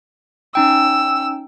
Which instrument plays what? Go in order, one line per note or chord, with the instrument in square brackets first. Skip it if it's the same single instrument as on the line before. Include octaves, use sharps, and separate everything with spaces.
[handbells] C#4 D#4 G5 [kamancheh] E6